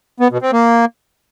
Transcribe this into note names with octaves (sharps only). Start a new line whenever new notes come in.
B3
B2
C4
A#3